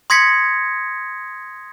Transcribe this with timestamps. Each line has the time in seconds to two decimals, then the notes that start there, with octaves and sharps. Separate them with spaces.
0.10 C6 D#6 G#6 A#6 B6 C#7